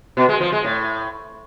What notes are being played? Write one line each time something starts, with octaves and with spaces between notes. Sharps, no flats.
B2
G#3
F3
G#3
A2